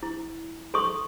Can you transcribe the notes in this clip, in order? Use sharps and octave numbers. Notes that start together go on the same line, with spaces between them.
E4
A4 C6 C#6 D#6